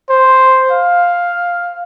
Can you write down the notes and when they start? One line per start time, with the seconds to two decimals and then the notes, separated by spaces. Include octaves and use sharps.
0.10 C5
0.72 F5